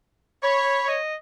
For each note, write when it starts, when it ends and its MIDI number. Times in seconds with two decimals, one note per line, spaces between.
0.43 0.98 73
0.43 0.87 83
0.88 1.14 75